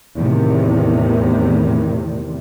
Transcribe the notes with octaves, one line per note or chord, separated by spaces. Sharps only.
E2 A2 C3 D#3